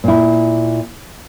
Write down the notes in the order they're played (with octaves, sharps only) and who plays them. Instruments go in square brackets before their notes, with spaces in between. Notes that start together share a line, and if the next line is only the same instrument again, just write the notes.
[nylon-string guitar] A#2 E4